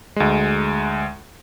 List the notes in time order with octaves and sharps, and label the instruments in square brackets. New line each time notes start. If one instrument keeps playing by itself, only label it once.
[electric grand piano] D2 G#3